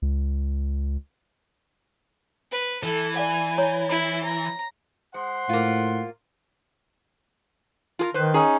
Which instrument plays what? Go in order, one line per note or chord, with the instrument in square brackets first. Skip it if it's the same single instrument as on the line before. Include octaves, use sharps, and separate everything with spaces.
[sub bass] C#2
[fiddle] B4
[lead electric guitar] E3 [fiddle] A4
[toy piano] D5 F5 F#5 [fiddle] G#5
[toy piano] C#5 A#5
[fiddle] E4 [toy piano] B5
[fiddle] A#5
[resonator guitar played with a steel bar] G#3 [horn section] C5 F#5 C6
[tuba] A2 [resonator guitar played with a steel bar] A#3 F4
[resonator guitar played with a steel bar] F4 G#4 A#4
[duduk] D#3 [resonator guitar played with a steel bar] B4 C5
[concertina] C#4 D#4 [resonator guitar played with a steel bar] G#4